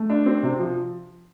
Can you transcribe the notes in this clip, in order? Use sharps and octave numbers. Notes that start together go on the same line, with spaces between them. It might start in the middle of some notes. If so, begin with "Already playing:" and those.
Already playing: A3
D4
C4
C3
F3